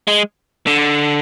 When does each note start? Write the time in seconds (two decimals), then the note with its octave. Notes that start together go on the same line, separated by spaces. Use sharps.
0.08 G#3
0.67 D3